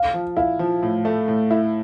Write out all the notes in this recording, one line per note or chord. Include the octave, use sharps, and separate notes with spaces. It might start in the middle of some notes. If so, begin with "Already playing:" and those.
Already playing: F5
F3
E4 F5
F3
A2
A3
A2
E4